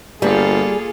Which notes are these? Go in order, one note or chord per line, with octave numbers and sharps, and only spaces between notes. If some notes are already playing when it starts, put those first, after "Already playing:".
G1 G3 A#3 F4 G#4 A4